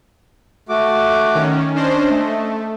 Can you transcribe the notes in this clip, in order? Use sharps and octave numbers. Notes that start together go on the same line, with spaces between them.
A3 F#4 D6
D#3 C#4
C#4 D4 C5 D#5
A3